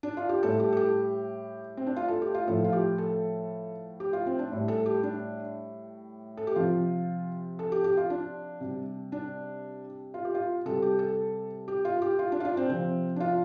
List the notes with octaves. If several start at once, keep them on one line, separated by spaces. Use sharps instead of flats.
D4
F4
G4
A2 G3 A4
G4
A4
G4
C4
D4
F4
A4
G4
F4
A2 F3 A4
F4
G4
A4
G4
F4
C4
D4
A2 G3
A4
G4
D4
A4
G4
C3 F3 F4
A4
G4
G4
F4
D4
C3 G3
D4
F4
G4
F4
C3 G3 A4
G4
A4
G4
F4
G4
F4
D4
F4
D4
C4
C3 F3 C4
D4
F4